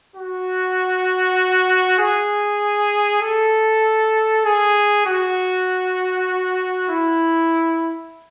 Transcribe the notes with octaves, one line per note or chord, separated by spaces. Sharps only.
F#4
G#4
A4
G#4
F#4
E4